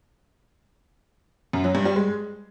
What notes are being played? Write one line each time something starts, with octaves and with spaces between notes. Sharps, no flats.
F#2
F#3
G2
G3
G#3